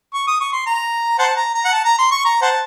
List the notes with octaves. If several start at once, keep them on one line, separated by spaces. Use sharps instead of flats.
C#6
D#6
C#6
C6
A#5
C5 F#5 A5
A#5
A#5
F#5
A5
A#5
C6
C#6
A#5
C5 F#5 A5